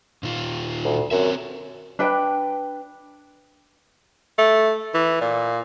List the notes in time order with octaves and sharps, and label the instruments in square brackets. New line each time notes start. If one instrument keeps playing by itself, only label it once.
[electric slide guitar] A#2 D#3 F4
[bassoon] D2
[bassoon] F#2 [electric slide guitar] C4 C#5 E5
[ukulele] D4 B4 G5
[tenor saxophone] A3
E3
A#2